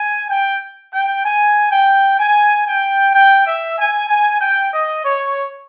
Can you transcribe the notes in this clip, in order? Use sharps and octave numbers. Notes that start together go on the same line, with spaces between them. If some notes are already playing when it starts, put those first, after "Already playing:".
Already playing: G#5
G5
G5
G#5
G5
G#5
G5
G5
E5
G#5
G#5
G5
D#5
C#5